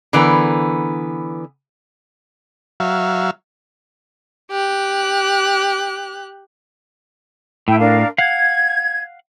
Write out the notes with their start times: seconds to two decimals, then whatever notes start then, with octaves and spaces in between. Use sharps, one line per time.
0.13 D3 E3 B3 A#4
2.80 F#3 E5 F5
4.51 G4 F#6
7.68 A2 E4 E5 G5
7.79 D4 A#4 F5
8.18 F5 F#5 G#6